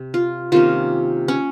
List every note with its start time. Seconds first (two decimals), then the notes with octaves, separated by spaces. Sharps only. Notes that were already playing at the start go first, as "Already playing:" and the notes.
Already playing: C3
0.14 F4
0.52 C3 D#3 A#3 C#4 F4
1.28 C#4